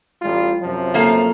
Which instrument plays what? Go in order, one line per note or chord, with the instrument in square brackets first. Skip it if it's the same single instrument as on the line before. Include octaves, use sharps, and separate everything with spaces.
[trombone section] A1 G3 F4
F#2 C3 F3
[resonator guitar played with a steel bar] A3 A#3 F5